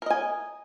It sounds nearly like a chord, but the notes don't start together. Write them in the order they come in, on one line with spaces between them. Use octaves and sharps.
A#4 D#5 G#5